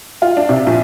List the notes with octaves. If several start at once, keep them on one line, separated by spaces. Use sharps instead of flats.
F4
D4
C3
A#1